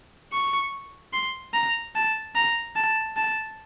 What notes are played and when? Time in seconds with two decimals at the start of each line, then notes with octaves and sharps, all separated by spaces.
0.33 C#6
1.13 C6
1.54 A#5
1.95 A5
2.35 A#5
2.76 A5
3.17 A5